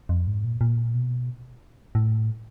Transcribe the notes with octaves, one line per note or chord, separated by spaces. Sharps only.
F2
G#2
A#2
A#2
B2
A2